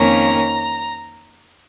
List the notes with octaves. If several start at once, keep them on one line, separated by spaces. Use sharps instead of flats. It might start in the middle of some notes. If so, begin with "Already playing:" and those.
Already playing: F2 D#3 A#3 C#4 A#5